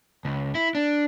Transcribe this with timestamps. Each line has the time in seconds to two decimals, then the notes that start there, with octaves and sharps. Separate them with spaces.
0.25 C#2
0.55 E4
0.75 D4